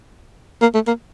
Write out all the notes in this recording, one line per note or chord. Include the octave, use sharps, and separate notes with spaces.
A#3
A3
A#3